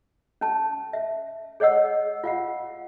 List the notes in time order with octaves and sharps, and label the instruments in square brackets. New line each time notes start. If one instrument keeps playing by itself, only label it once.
[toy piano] C#4 A5
E5
G#4 C#5 D#5 F#5 E6
F4 F5 F#5